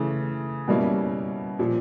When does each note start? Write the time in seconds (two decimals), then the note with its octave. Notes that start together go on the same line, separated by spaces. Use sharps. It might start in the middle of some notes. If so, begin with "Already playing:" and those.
Already playing: C#3 E3 A3
0.68 B2 G3 A#3 C#4 E4
1.59 A#2 F3